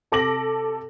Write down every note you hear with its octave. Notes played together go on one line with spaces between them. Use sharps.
C3 A4 D6 A#6 F#7